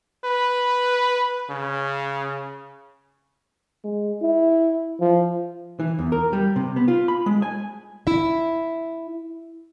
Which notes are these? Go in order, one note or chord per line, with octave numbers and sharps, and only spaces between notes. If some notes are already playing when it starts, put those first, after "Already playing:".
B4
C#3
G#3
E4
F3
E3
E2
A#4
G3
C3
B3
F4
B5
G#3
G#5
E4 E5